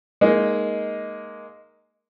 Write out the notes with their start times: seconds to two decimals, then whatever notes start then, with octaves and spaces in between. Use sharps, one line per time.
0.21 G#3 A#3 D#4